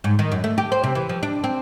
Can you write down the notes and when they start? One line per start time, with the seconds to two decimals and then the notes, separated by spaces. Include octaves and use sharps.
0.04 G#2
0.19 D#3
0.32 F#2
0.44 A3
0.58 G4
0.72 C5
0.84 C3
0.95 E3
1.09 F3
1.23 D4
1.44 C4